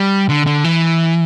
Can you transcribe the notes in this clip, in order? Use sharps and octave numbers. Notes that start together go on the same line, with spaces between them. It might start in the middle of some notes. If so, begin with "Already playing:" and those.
Already playing: G3
D3
D3
E3